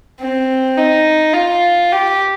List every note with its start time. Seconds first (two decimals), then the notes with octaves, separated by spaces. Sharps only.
0.20 C4
0.77 D#4
1.34 F4
1.92 G4